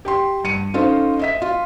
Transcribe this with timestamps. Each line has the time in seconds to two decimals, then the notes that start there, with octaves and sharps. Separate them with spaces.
0.05 G4 G5 C6
0.44 G2 C#7 D#7
0.74 C#4 D#4 F4 A4 C5
1.19 D#5 E5 B6
1.42 F4